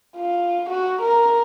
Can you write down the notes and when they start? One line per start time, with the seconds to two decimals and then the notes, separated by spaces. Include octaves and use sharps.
0.16 F4
0.69 F#4
1.01 A#4